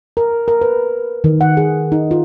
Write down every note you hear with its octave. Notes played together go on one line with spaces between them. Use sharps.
A#4
A#4
B4
D#3
F#5
G#4
D#4
F4